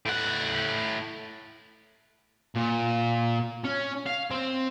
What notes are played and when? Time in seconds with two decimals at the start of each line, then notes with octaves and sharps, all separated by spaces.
0.06 A2 F#5
2.56 A#2
3.64 C#4
4.06 F5
4.31 C4